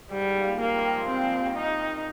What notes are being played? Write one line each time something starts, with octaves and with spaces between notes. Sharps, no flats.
G#2 G3
A#2
C3 A#3
D#3 G3
F3 G#3
G3 A#3 C4
F3 G#3
G3 A#3
D#3 G3
D#4